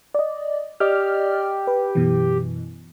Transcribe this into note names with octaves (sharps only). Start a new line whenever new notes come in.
D5 D#5
G4 D5 D#5 F6
B4
F#2 B2 E3